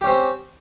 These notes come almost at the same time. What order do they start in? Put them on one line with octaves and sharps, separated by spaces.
G4 C#4 C4